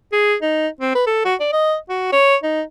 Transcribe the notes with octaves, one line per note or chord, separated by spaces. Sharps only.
G#4
D#4
C4
B4
A4
F#4
D5
D#5
F#4
C#5
D#4